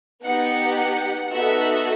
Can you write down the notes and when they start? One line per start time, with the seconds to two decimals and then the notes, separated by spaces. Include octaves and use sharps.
0.24 B3 D#4 G4 F#5
1.34 B3 D#4 F#4 A4 E5